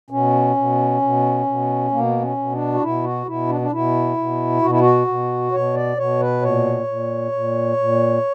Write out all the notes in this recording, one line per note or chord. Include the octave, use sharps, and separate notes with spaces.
B2 C#4
B2
B2
B2
B2 A#3
C#4
B2
D4
F#4
B2 E4
F#4
B2 E4
D4
D4
B2 E4
B2
B2 F#4
E4
F#4
B2
B2 C#5
D5
B2 C#5
B4
A#2 C#5
A#2
A#2
A#2